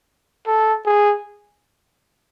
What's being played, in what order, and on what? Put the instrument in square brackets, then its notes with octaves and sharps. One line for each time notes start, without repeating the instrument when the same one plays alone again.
[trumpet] A4
G#4